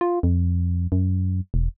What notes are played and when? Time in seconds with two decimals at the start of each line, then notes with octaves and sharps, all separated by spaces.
0.01 F4
0.23 F2
0.92 F#2
1.54 E1